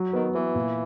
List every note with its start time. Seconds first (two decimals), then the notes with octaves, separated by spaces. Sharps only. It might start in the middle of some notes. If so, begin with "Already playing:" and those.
Already playing: F#3
0.13 D#3 B3
0.35 E3 B3
0.55 A#2